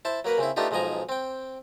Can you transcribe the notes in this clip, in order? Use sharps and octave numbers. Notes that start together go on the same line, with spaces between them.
E4 C5 A5
F#3 A#3 A#4 B4
C#3 C4 E4
A3 B3 D4 D#4 F4 G4
B1 G#2 F3 D#5 G#5 A#5
C4 G5